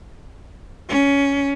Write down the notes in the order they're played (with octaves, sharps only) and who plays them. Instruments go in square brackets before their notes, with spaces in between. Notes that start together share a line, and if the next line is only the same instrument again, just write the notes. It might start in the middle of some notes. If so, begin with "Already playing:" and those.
[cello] C#4